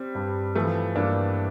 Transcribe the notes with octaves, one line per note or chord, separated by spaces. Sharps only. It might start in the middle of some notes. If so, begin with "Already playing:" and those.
Already playing: G3 C4
G2
E3 F3 A3
G2 A#3 D4